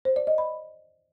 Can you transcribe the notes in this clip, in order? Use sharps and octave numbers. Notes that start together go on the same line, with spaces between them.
C5
D5
D#5
B5